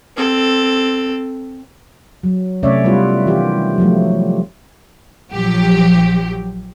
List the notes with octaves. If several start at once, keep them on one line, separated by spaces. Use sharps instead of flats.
C4 A4
F#3
C3 A3 C#4 C#5 D5 E5
G3 B3 E4 F4 B4
D#3 E3 F4 G4
F3 F#3 A3
A#1 F3 F#3 G4